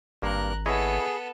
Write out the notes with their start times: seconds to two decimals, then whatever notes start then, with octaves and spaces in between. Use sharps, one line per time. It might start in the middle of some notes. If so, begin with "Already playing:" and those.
0.22 G#1 G2 A#3 A#4 F#6
0.66 B3 E4 G#4 A4 C#5 D#5